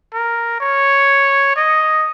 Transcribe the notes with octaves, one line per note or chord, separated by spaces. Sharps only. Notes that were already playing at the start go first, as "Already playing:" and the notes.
A#4
C#5
D#5